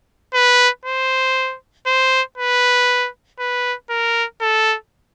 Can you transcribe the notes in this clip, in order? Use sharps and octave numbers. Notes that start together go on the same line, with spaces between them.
B4
C5
C5
B4
B4
A#4
A4